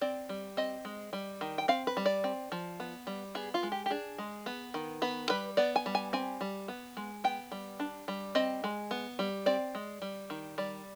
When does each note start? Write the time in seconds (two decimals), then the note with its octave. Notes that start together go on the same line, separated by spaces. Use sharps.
0.01 C4 D5
0.29 G3
0.57 C4 D#5
0.85 G#3
1.13 G3
1.41 D#3
1.58 G5
1.68 C4 F5
1.87 B4
1.97 G3
2.06 D5
2.24 C4
2.52 F3
2.80 B3
3.07 G3
3.35 B3 G#4
3.54 F4
3.63 G#3
3.72 G4
3.86 G4
3.91 D4 G#4
4.18 G#3
4.46 B3
4.74 D#3
5.02 B3 B4
5.29 G3 B4
5.57 B3 D5
5.76 G#5
5.86 G3
5.95 G#5
6.13 C4 G#5
6.41 G3
6.68 B3
6.97 G#3
7.24 B3 G5
7.52 G3
7.80 D4
8.08 G3
8.35 C4 D#5
8.64 G#3
8.91 B3
9.19 G3
9.46 C4 D5
9.75 G#3
10.02 G3
10.30 D#3
10.58 G3 D5